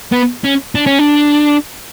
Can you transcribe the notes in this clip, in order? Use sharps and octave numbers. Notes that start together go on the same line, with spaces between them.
B3
C#4
D4
C#4
D4